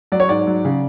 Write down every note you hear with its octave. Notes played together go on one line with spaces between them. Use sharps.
F#3 D5
C#5
G#2 D5
F#3
C#3